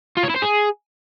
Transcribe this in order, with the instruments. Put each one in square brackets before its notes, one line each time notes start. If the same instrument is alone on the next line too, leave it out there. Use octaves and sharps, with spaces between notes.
[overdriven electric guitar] F4
C#5
E4
C5
G#4